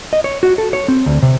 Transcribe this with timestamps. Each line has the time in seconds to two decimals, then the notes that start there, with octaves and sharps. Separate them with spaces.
0.13 D#5
0.24 C#5
0.43 F#4
0.58 A4
0.73 C#5
0.88 C4
1.06 D2
1.22 C3